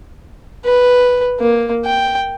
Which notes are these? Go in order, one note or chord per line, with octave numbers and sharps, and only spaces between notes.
B4
A#3
G5